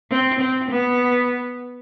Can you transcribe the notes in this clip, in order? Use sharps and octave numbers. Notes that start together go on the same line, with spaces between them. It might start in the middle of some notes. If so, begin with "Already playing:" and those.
C4
C4
B3